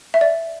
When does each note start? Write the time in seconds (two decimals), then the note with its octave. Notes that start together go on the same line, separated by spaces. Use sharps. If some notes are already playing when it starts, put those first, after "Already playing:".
0.14 E5
0.21 D5